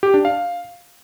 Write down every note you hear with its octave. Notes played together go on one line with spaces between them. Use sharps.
G4
D4
F5